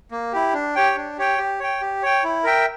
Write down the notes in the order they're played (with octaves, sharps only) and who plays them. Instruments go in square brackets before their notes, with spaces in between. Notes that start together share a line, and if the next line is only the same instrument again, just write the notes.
[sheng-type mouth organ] A#3
E4 G4
D4
G4 C#5 G5
D4
G4 C#5 G5
G4
C#5 G5
G4
C#5 G5
E4
A#4 E5 G5